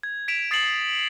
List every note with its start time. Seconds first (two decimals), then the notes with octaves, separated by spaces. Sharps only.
0.03 G#6
0.28 B6 D7 E7 F7
0.51 D#6 A6 C7 C#7 E7 F#7
0.64 C7